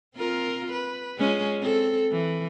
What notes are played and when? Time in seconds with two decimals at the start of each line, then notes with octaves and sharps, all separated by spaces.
0.15 C4 F4 A#4
0.72 B4
1.18 G#3 C#4 F4
1.61 C4 A4
2.12 E3